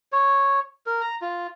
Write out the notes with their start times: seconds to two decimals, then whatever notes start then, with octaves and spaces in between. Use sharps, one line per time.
0.12 C#5
0.86 A#4
1.01 A#5
1.21 F4